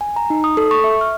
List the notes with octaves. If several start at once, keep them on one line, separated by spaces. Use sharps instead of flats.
G#5
A#5
D#4
D#6
A4
C#6
E5
F6